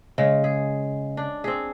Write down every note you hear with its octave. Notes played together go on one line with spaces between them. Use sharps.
C#3 G#3
G#4
D4
C4 G#4